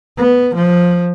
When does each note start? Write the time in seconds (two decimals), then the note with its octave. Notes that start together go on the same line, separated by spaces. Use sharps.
0.17 B3
0.54 F3